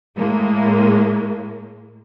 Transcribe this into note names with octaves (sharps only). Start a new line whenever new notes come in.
A2 G#3 A#3